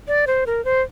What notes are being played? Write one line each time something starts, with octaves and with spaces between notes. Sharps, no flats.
D5
C5
A#4
C5